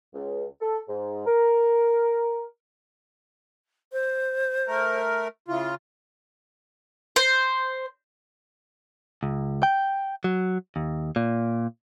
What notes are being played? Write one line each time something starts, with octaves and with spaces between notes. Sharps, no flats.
C#2
A4
G#2
A#4
C5
A3 A#4
C#3 E4 F4
C5
C#2
G5
F#3
D#2
A#2